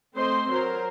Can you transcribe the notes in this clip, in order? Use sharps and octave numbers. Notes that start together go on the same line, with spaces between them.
A3 C4 C5 D#5 C6
F#3 A#4 C5